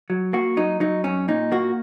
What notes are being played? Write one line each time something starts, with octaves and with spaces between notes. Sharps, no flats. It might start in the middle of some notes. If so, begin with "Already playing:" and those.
F#3
A#3 F#4
F#3 D#4
F#3 D#4
F#2 C#4
A#2 D#4
A#3 F#4